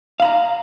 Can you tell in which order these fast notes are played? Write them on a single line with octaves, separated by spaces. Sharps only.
F5 B5 A#5